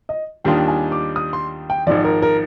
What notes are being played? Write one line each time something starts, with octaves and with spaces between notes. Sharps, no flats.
D#5
D#2 D#3 G3 D4 F4 G5
G#5
D6
D#6
C6
G5
G#1 G#2 F3 D5
A#4
A#4